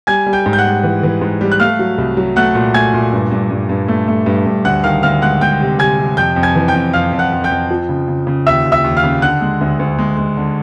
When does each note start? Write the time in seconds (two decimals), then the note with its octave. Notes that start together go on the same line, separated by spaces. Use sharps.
0.07 G3 G#5 G#6
0.26 G3
0.33 G5 G6
0.46 G#2
0.53 G6
0.58 F#5 F#6
0.65 G3
0.83 E3
1.03 E3
1.21 G#2
1.41 G3
1.52 F#6
1.60 A3 F5 F6
1.79 F#3
1.98 C2
2.17 F#3
2.36 A3 F#5 F#6
2.55 A#2
2.74 A3 G#5 G#6
2.94 A#2
3.13 G2
3.31 G2
3.51 G2
3.69 G2
3.88 A3
4.08 A3
4.26 G2
4.46 G2
4.65 D2 F#5 F#6
4.84 D#3 F5 F6
5.03 D2 F5 F6
5.22 G#3 F#5 F#6
5.41 G#3 G5 G6
5.60 C3
5.79 C3 G#5 G#6
5.99 C3
6.17 F2 G5 G6
6.36 F2
6.43 G#5 G#6
6.55 E3
6.68 G5 G6
6.75 F2
6.93 F2 F5 F6
7.13 F2
7.19 F#5 F#6
7.32 F2
7.44 G5 G6
7.51 F2
7.71 F3
7.89 C#3
8.08 C#3
8.27 C#3
8.47 D#2 E5 E6
8.66 D#2
8.72 E5 E6
8.84 D#2
8.97 F5 F6
9.04 C#3
9.22 D3 F#5 F#6
9.41 G#3
9.61 D2
9.79 D2
9.99 G#3
10.17 G#3
10.37 D3